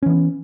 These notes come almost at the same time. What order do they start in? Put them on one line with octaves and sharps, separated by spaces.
C#4 E3 B3